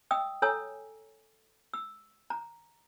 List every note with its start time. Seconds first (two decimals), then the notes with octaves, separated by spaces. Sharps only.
0.11 D#5 G5 D#6 E6
0.42 A4 C#5 G#5 A#5 E6
1.74 E6
2.30 A#5